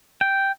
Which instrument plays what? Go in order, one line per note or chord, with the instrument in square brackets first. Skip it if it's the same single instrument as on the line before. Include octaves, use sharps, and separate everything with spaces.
[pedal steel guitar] G5